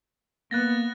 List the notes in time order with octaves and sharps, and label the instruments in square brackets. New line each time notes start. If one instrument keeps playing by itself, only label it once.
[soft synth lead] A#3 [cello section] B3 [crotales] F#6 A6 A#6